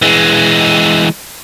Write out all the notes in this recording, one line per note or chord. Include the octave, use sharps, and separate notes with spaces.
E3 G#3